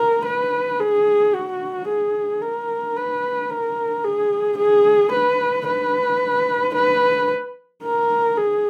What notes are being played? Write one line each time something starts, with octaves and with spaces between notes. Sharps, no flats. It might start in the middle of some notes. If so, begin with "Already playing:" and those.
Already playing: A#4
B4
G#4
F#4
G#4
A#4
B4
A#4
G#4
G#4
B4
B4
B4
A#4
G#4